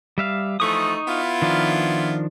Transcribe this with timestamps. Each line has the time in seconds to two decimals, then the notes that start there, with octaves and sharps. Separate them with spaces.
0.18 G3 E5 F5
0.60 E3 F3 A3 D#4 C#6 D#6
1.08 B3 E4 F4
1.42 D#3 F3 D4